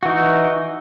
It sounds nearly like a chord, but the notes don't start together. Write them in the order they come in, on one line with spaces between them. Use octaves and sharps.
F#4 E3 D#4